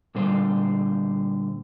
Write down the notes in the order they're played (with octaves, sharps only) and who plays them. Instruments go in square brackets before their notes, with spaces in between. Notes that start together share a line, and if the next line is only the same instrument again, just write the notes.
[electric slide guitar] A#2 D3 G3 C5